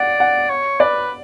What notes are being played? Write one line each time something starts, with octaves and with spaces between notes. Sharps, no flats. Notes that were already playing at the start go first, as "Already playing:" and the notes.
Already playing: D5 F#5
F#5
C#5
B4 D5